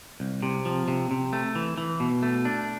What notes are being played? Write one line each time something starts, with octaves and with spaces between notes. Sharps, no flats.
C2
C3
F3
C3
C3
A3
E3
E3
B2
A3
D4